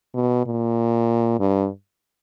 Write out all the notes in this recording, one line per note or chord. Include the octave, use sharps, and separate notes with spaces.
B2
A#2
G2